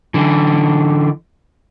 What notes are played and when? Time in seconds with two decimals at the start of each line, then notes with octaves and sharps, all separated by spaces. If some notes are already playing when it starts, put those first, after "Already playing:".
0.14 D3 E3